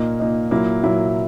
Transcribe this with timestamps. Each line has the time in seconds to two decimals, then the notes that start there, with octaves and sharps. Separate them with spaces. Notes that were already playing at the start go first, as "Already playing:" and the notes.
Already playing: A#2 A#3 D#4
0.20 A#2 A#3 D#4
0.51 A#2 F#3 A#3 E4
0.84 A#2 F#3 A#3 E4